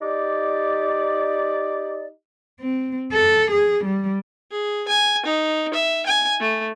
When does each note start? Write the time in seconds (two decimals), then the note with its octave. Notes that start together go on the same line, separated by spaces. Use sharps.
0.01 D#4 G4 D5
2.61 C4
3.13 A4
3.51 G#4
3.85 G3
4.51 G#4
4.88 G#5
5.26 D#4
5.74 E5
6.06 G#5
6.40 A3